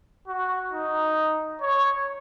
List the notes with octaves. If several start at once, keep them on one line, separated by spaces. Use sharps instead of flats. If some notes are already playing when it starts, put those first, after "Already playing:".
F#4
D#4
C#5